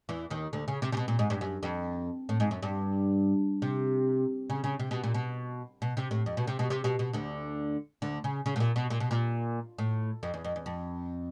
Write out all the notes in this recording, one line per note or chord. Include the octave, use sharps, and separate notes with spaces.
E2 E3
D#2 D#3
D2 D3
C#3
C3
C3
B2
A#2
G#2
G2
F#2
F2
A2
G#2
F#2
G2
C3
C#3
C#3
C3
B2
A#2
B2
B2
C3
A2
F2
B2
C3
B2
C3
B2
B2
D2 D3
D2 D3
C#3
C#3
A2
A#2
B2
A#2
B2
A#2
A2
F2
E2
F2
E2
F2